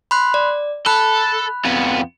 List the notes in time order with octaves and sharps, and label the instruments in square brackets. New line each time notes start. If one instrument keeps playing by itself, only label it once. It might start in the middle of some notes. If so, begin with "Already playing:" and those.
[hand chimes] B5 C6 F#6
D5
[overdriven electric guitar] A4 [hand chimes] B5 F#6
[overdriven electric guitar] F2 B3